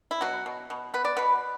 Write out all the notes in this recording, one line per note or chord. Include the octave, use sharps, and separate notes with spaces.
E4
B2 F#3 F#4
B2
B2
B3 B4
D5
B2 B3 B4